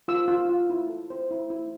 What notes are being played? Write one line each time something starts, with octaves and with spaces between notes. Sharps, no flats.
F4 E6
F4
F4
E4
A4
C5
E4
E4